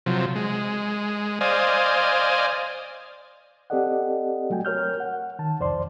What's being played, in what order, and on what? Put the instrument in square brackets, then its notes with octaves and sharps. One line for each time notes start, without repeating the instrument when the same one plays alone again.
[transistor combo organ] C3 F3 F#3
G#3
C5 D5 D#5 F5 G#5
[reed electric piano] C4 G4 A4 D5 D#5 F#5
F#3 A3 F#4 G5 G#5
A#4 C#5 F6 G6
F#5
D#3 A5
C2 F2 C5 D5 C6